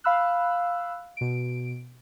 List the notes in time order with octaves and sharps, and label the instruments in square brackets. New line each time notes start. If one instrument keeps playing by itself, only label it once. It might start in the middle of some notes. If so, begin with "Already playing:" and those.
[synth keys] F5 B5 E6 F#6
B2 D7